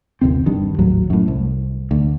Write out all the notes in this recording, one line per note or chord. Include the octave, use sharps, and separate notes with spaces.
G1 D#2 C3 C4
F#1 G2 D#3
G#1 D#2 A2 F#3
F#2 A2
C2
D2